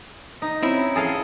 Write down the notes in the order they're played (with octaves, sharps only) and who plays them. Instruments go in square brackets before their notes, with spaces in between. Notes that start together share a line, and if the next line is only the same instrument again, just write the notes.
[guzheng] D#4
[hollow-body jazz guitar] C4 C#4 E4
[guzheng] G#4 A4 F5